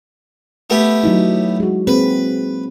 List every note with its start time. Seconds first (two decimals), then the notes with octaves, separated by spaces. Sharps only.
0.70 A3 B3 G4
1.03 F#3 D#4 E4
1.60 G#3 F#4
1.87 A#3 C4 G#4 B4